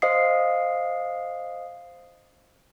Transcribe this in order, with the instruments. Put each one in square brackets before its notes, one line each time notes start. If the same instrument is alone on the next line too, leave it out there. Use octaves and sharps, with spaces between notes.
[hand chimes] C5 D#5 F5 D#6 C7